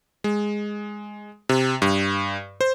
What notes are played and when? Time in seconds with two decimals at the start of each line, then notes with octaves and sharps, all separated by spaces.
0.24 G#3
1.49 C3
1.82 G2
2.61 C5